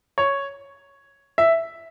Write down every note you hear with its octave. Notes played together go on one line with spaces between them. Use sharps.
C#5
E5